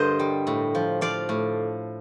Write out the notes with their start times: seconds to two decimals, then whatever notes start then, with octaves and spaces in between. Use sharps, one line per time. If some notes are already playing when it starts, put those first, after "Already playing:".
Already playing: G2 D3 A#4 C5 D#5
0.19 G3
0.47 A2
0.75 F3
1.01 F3 D5 F5
1.29 A2